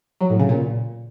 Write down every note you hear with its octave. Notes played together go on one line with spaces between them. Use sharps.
F#3
A2
C#3
A#2